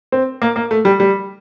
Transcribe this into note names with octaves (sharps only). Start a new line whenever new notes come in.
C4
A#3
A#3
A3
G3
G3